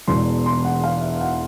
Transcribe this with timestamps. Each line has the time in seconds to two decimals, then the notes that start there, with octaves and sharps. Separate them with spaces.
0.08 E1 E2 B2 C6
0.46 C6
0.65 F#5
0.84 F5
1.01 E5
1.21 F#5